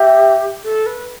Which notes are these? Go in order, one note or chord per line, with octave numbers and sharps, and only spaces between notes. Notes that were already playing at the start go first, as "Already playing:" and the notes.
Already playing: G4 E5 G5
A4
B4